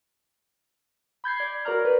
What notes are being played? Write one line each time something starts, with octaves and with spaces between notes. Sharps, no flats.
B5 G6 G#6 C7
D5
F#4 A#4 C#5 D5 A#5 F6
B4